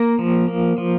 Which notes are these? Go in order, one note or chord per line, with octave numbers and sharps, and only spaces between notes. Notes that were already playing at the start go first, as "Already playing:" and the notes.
Already playing: A#3 A#4 A#5
F3
A#3
F3